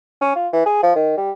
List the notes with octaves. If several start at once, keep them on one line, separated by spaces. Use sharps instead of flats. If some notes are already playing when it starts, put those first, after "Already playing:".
C#4
F4
E3
G#4
F3
D#3
G3